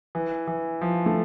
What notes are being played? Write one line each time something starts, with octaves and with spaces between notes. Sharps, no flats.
E3
E3
F3
A3